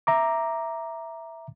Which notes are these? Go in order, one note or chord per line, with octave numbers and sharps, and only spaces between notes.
E5 A#5 D6